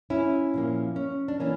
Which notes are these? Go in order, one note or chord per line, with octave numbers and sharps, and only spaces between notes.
C#4 E4
A#2 F3 A#3
C#4
D4
E3 A#3 C#4